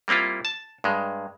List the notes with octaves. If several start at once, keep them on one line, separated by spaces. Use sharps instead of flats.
G3 A#3 C4 E4 F4
A5
G2 G#3